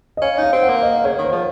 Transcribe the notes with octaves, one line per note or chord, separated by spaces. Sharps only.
D#5
C#4 F5
D#4 F5
C4
F#5
A#3
D#5
C#3 C#5
D#3
C5
F3